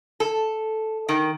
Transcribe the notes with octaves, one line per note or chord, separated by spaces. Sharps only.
A4
D#3